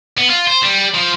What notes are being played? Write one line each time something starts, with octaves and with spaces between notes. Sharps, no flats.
B3
F4
C5
G3
F3